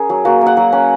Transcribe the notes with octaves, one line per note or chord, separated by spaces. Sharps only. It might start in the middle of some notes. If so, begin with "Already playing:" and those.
Already playing: C#4 G#4 A#4
F#3
A#3 F#4
A#3
F#5
F#3
C#4